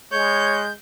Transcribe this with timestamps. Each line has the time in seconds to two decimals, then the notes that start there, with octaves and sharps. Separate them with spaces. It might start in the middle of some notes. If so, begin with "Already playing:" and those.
0.12 G#3 C#5 G6